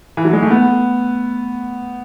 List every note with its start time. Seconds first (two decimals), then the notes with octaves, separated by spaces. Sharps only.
0.17 E3
0.25 F#3
0.33 G#3
0.42 A3
0.50 B3